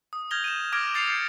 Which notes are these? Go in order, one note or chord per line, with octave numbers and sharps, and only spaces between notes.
D#6
F6 G6 G#6 A#6 F7 G7
D#7 E7
D6 F6 G#6 A#6 D7
G6 A6 C7 C#7 F7
C7 C#7